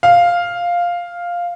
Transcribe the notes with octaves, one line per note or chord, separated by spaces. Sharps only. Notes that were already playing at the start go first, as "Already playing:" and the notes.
F5